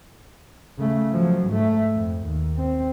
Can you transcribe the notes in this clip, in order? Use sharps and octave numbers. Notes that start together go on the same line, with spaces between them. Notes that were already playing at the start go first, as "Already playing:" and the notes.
C#3 A3
F3 F#3
G#2 A3
F2
D#2
C4